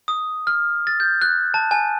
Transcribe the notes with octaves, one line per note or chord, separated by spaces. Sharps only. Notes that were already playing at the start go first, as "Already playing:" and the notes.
D#6
F6
A6
G6
F#6
A5
G#5